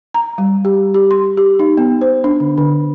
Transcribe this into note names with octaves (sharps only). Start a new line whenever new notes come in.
A#5
G3
G4
G4
C6
G4
D#4
B3
C5
D4
D3
D3